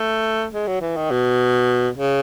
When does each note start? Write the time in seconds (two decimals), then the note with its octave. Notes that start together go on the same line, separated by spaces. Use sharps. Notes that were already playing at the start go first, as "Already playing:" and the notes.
Already playing: A3
0.53 G#3
0.67 F#3
0.81 E3
0.97 D#3
1.11 B2
1.97 C#3